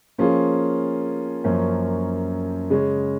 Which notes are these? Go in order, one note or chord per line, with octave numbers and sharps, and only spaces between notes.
F3 A#3 C#4 F4 G#4
F#2 F3 A#3 C#4
C#3 G#3 C#4